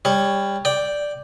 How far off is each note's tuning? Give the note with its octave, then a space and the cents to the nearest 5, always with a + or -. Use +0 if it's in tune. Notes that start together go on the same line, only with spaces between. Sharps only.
G3 +20 C#5 +5
D5 +0 G5 +0